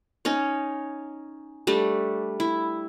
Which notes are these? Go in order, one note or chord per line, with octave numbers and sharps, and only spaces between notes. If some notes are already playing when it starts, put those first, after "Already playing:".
C#4 D#4 C#5
G3 A3 D4
E4